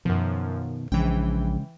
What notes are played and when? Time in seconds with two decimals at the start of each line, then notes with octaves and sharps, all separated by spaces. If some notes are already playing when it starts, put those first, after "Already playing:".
0.05 F#2 B2 D#3 F3
0.92 A#1 C#3 E3 G#3 C#4 G5